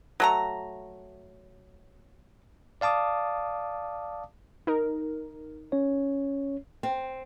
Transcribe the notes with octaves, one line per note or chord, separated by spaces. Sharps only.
F#3 A3 A#5
D5 F5 A5 D6 D#6
D#4 A#4
C#4 C#5
C4